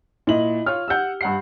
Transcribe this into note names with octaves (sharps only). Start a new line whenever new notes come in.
A#2 E4 D#5 F#7
F4 C#5 F6
G4 F#5 E6 G6
G2 F#5 C7